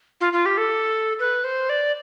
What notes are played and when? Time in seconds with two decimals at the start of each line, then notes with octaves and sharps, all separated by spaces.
0.21 F4
0.33 F4
0.46 G4
0.58 A4
1.19 B4
1.44 C5
1.69 D5